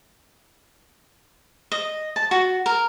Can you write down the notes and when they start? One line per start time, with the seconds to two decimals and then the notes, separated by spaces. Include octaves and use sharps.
1.72 D#5
2.16 A5
2.31 F#4
2.66 A#4